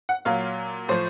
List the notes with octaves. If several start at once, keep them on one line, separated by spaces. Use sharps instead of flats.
F#5
A#2 F#3 F5
A2 F3 C5